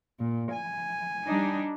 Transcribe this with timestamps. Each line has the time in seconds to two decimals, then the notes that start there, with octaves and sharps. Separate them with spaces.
0.19 A#2
0.51 G#5
1.26 G3 D4 D#4